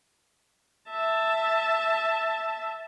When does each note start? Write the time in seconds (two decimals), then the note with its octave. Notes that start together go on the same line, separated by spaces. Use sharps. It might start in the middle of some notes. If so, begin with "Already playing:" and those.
0.90 E5 A5